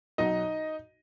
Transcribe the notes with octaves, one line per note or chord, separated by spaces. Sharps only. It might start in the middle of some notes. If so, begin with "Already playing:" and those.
B1 B2 F#3 D#4 D#5